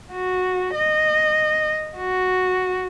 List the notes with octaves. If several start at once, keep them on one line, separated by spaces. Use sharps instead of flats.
F#4
D#5
F#4